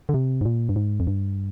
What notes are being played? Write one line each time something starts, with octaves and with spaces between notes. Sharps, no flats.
D3
C3
G#2
A#2
G2
G#2
F2
G2